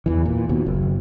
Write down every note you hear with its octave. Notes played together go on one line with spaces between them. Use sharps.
E2 E3
A#2
D#2 B2
F#1